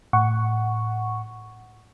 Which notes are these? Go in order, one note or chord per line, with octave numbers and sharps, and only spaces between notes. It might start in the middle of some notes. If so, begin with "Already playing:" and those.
A2 F#5 C#6